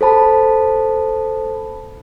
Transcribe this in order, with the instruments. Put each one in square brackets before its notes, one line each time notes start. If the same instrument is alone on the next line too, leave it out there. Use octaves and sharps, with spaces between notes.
[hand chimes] A4 C5 A5 B5